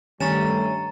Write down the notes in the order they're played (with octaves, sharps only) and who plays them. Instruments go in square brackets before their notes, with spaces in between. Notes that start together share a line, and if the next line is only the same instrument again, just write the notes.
[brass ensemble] G2 G3 A3 [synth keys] D#3 [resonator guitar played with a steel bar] C#4 [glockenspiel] A#5 A6 E7